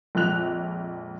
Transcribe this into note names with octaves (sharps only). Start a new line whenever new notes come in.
A#1 F2 G#3 F#6 F7